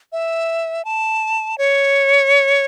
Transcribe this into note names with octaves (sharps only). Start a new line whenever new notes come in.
E5
A5
C#5